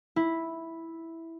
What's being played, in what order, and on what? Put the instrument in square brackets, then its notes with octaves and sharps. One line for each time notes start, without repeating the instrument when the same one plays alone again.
[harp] E4